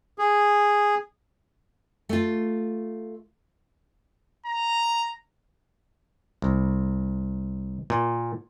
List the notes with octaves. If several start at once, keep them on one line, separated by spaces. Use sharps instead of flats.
G#4
A3 F4
A#5
C2
A#2